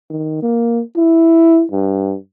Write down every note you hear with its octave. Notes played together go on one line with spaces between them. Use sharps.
D#3
A#3
E4
G2